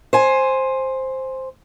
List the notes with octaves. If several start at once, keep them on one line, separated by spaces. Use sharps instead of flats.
C5 G#5